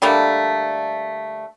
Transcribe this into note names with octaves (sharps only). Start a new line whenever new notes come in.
D3 G3 A3 A#3